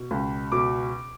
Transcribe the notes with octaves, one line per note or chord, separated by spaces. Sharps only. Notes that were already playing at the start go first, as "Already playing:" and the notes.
Already playing: B2
C#2
B2 D6